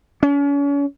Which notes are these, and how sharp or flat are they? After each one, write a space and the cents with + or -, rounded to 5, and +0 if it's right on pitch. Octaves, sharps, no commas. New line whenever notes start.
C#4 +40